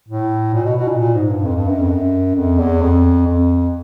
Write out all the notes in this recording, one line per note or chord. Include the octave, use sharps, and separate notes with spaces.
A2
A#2
B2
B2
A#2
A#2
G#2
G2
F2
G2
F#2
F2
F#2
F2
E2
F2
F2